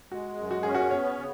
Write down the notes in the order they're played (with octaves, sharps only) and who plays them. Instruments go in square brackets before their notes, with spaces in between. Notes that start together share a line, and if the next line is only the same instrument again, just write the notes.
[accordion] G#3 [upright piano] F#4
[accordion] F#2
[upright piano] F#4
[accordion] C#4 [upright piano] G#4
[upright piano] F#4
[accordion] B3 [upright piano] C#5
[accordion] C#3